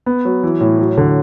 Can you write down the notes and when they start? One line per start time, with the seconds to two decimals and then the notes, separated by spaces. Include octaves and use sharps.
0.06 B3
0.25 F#3
0.43 E3
0.60 A2
0.79 F#3
0.97 D3